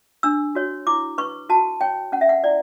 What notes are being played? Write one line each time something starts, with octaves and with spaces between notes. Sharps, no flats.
D4 E6
F#4 C#5
E4 D6
B4 C#6
F#4 A5
C#5 G5
C#4 F#5
E5
F#5
E4 D5